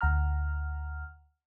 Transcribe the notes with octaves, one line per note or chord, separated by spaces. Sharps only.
D2 F#5 A#5 F6